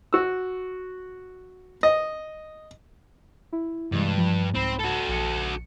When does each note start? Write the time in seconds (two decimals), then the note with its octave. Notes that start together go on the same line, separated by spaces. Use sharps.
0.13 F#4 E6
1.83 D#5
3.53 E4
3.92 G2 C3 E3 G#3
4.17 F3
4.55 C2 G#2 C4 B5
4.79 F#4 A4
5.08 A#1 C#7